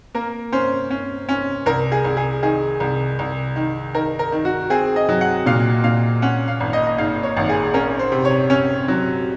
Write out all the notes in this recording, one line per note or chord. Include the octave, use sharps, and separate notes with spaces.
A#3 A#4
C#4 C5
C#4
C#4
C2 A#4
G#4
C2
G#4
D#3 G#4
C2
C2
D#3
D#3 A#4
A#4
D#3
F#4
C4 G#4
D#5
F#3
F#5
A#2 F5
A#2 F5
C#4 F#5
F5
G#1
D#5
D#5
G#2 F5
C#5
G#1
G#4
C#4 A#4
C5
C3
C#5
C#4 C#5
F#3